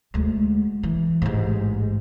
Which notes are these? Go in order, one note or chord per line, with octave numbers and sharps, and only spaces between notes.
D2 G#3
E3
A1 G#2